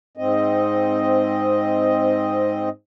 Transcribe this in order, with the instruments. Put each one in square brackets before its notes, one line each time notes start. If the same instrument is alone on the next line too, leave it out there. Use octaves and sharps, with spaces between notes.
[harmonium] G#2 C4 D#5